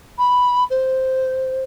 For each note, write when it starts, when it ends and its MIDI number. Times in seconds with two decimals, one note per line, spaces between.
0.18 0.63 83
0.70 1.63 72